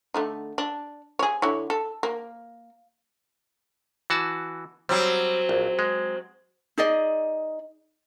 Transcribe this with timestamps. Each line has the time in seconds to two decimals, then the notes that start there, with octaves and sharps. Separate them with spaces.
0.14 D3 A3 D#4
0.58 D4
1.19 G#4 C#5
1.42 D3 E4 C#5
1.70 A4
2.03 A#3
4.10 E3 F#4 A5
4.89 F#3 G3 C4
5.49 A#1
5.79 G#3
6.78 D#4 G#4 D5 D#5